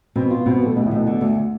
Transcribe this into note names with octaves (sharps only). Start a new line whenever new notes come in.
B2 C4
B3
F4
B3
B2 C4
B3
G3 A3
D2 B2
A2
D2 B2
D3
D2